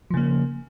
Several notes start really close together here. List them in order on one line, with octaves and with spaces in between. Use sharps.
F3 C#3 A#3